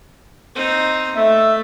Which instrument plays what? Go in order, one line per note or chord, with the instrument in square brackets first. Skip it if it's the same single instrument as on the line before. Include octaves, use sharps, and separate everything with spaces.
[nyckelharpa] C4 D#4
[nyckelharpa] A3 [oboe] E5